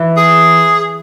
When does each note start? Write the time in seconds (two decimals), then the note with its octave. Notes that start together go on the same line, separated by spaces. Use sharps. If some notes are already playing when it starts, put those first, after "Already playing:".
Already playing: E3
0.17 G#4